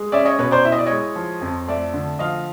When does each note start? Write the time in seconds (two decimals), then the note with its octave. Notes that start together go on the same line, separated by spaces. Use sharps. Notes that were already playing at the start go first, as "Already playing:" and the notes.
Already playing: G#3
0.12 C#4 D5 E5
0.25 C#5 D#5
0.38 B2 B4 C#5
0.51 C5 D5
0.65 E4 E5
0.72 D#5
0.78 D5
0.86 G#3 C#5 D#5
1.16 F3
1.41 F2
1.68 A3 D5 E5
1.94 D3
2.19 F3 D#5 F5